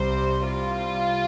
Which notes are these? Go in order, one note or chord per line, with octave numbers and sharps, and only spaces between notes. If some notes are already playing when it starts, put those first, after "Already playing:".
Already playing: C2 C3 G3 C5
F4